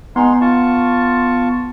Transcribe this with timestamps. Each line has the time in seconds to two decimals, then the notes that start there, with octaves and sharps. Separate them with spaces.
0.16 G#3 B3 D#4 C6
0.41 F4 A5 C#6